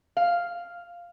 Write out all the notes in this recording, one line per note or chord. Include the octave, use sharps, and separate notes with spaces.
F5